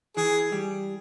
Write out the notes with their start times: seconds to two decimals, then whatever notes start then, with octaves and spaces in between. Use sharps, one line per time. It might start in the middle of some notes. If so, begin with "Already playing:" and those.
0.16 E3 G#4
0.52 G3